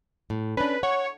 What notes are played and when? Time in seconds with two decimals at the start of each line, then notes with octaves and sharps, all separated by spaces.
0.30 A2
0.57 C#4 D4 B4
0.83 C#5 F#5